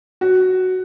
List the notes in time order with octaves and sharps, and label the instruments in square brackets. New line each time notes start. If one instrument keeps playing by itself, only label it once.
[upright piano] F#4